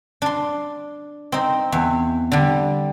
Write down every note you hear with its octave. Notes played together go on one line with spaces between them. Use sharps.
D4 C6
C4 D#4
E2
D3 G3